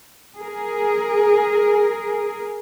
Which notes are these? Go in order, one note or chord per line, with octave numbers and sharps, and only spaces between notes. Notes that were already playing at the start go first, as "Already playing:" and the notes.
G#4 A#4